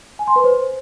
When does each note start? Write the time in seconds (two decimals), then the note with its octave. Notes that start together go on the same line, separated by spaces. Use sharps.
0.19 G#5
0.28 C6
0.36 B4
0.44 C5